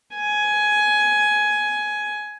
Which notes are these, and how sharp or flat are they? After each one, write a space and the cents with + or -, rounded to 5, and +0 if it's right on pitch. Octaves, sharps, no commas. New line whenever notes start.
G#5 +15